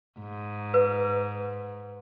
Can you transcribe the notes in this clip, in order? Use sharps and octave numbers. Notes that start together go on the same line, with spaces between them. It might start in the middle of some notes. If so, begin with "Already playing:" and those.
G#2
B4